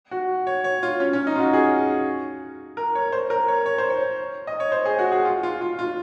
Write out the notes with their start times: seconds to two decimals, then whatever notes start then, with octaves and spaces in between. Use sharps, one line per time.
0.11 F#4
0.47 C#5
0.64 C#5
0.83 F4
1.00 C#4
1.13 C#4
1.27 D#4
1.35 F4
1.40 F#4
1.53 G#4
2.77 A#4
2.95 C#5
3.12 C5
3.30 A#4
3.48 C#5
3.66 C#5
3.78 C5
3.90 C#5
4.47 D#5
4.60 C#5
4.72 C5
4.85 G#4
4.99 F#4
5.12 G#4
5.25 F4
5.43 F4
5.61 F4
5.79 F4